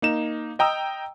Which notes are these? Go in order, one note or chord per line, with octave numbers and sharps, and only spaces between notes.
A#3 D#4 E7
D#5 G5 A#5 D#6 E6